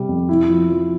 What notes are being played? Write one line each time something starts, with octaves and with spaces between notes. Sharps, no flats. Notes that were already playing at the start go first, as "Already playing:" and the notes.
Already playing: C3 G3
F2
E4
F3
F3